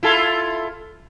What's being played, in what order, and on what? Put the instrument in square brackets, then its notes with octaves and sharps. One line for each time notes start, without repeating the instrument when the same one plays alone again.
[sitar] E4 F4 A4